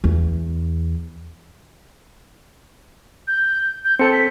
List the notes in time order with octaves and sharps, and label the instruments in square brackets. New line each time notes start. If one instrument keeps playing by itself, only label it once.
[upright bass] E2
[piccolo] G6
G6
[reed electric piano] C4 A4 G6 [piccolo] C#7
[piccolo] B6